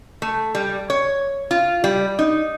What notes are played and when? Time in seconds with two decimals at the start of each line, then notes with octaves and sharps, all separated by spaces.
0.22 A3
0.55 G3
0.90 C#5
1.51 F4
1.84 G3
2.19 D#4